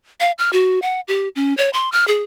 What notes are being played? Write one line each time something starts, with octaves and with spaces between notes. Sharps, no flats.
F5
F6
F#4
F#5
G4
C#4
C#5
C6
F6
G#4